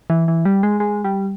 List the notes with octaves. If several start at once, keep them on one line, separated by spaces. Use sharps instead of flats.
E3
E3
G3
G#3
G#3
G3